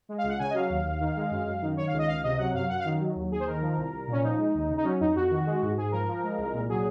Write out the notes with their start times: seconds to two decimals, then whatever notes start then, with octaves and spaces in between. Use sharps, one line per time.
0.09 G#3
0.18 F5
0.23 C#2
0.29 F#5
0.39 C#3 G#5
0.50 D#5
0.54 F#3 F5
0.70 D#2
0.85 D#2
1.00 D#3
1.17 G#3
1.31 F#2
1.46 F#2
1.62 D#3
1.77 D#3 C#5
1.87 F5
1.92 C#2
1.98 D#5
2.08 C#2 F5
2.24 C3 D#5
2.38 F#3 F#5
2.54 F#2 F5
2.69 F#2 F#5
2.79 F5
2.85 D#3
3.00 F#3
3.15 D#2
3.31 D#2 G#4
3.40 C5
3.46 D#3 A#4
3.61 F3
3.77 C2
3.92 C2
4.07 A#2 C#4
4.23 F3 D#4
4.39 G#3
4.54 D#2
4.70 C#3
4.78 D#4
4.84 F#3 C#4
5.00 F2 D#4
5.15 F2 F#4
5.30 D#3
5.46 G#3
5.62 G#2
5.77 G#2 G#4
5.92 F3 A#4
6.08 F3
6.24 G#3
6.38 C2
6.53 A#2
6.69 F#3 G#4